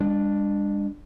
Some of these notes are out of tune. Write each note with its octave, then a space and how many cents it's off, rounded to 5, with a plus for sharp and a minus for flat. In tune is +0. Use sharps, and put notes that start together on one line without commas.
G#3 -45 D4 +0